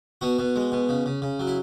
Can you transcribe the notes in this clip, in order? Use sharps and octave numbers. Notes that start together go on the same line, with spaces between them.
B2 F#4
B2
G#3
B2
C#3
C#3
C#3
F#3
E4